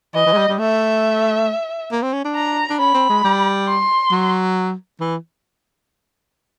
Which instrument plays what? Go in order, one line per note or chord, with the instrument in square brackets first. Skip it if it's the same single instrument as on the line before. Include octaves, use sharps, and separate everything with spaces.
[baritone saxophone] E3 [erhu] D#5
[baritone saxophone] E3
G#3
G3
G3
[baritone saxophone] A3 [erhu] E5
[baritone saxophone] A#3
C4
C#4
D4
[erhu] A#5
[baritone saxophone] D4
[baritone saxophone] C#4 [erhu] B5
[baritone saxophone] C4
G#3
G3
[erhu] C6
[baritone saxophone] F#3
E3